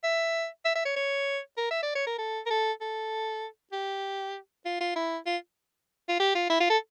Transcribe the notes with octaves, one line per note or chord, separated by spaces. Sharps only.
E5
E5
E5
C#5
C#5
A#4
E5
D5
C#5
A#4
A4
A#4
A4
A4
G4
F4
F4
E4
F4
F4
G4
F4
E4
F4
A4